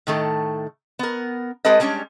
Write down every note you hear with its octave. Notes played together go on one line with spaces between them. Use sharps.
A2 D#3 A3 A4
B3 A#4
G#3 C4 G4 A4 B4 D#5
G3 G#3 C#4 D4 C#5